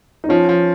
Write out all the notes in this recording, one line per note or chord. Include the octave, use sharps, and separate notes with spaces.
D#4
F3 C#4 F4
F3